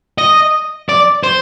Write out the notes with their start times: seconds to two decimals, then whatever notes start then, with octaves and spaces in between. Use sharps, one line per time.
0.18 D#5
0.89 D5
1.23 C5